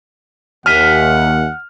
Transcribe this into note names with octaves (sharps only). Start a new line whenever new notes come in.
D#2 E5 F#5 G#5 F6